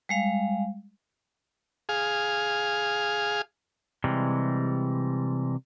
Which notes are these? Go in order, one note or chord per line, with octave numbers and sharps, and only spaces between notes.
G3 G#3 F5
G#4 F5
C3 E3 G3 G#3